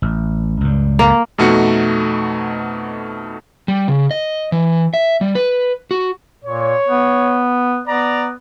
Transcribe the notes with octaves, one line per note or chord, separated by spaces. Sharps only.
A1
C#2 G2
A#3
F2 B2 A3 D#4 F#4 C#7
G3
C#3
D#5
E3
E5
G3
B4
F#4
A#2 C#5
B3
B3 D5 A#5